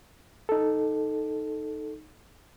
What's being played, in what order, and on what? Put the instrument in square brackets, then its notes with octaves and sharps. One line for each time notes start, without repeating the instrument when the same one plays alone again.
[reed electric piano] D#4 A4